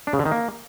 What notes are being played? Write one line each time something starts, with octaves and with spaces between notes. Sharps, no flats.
D4
C#3
D3
D#3
A#3